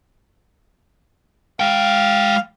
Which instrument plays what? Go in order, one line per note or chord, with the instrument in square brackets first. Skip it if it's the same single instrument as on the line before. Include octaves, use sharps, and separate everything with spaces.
[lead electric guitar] G#3 G5 [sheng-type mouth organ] F5